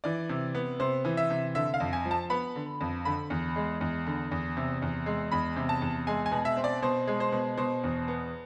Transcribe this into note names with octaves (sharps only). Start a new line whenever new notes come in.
E3 D5
C3
B3
C3 C5
E3
E5
C3
D3 E5
F5
F2
G#5
F3
A5
B3 B5
D3
F2
D3 B5
E2
G#3
E2
D3
E2
C3
E2
G#3
E2 B5
C3
A5
E2
G#3 G#5
G#5
B2
E5
C4
D5
B2 C5
G#3
C5
B2
B2 C5
E2
B3